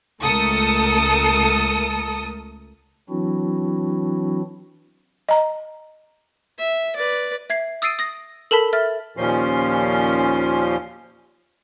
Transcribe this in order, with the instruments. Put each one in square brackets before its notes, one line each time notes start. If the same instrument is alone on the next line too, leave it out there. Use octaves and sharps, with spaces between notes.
[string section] C#2 A3 A4 A#4 D#6 C#7
[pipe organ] E3 F#3 C4 D4 E4 F#4
[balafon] D#5 A#5
[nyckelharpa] E5
B4 D5
[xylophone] E5 G#6 C7
D#6 E6 A6 C7 D7 D#7
D#6 A#6
A4 A#4 A5 B5 B6
E5 F6 A6
[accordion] D#2 A#2 F3 C#4 C6